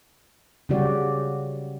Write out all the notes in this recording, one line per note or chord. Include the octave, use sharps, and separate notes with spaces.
C#3 F#3 G3 F#4 G4 D5